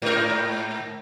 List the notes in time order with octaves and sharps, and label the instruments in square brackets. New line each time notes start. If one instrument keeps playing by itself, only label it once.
[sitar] G#2 A#4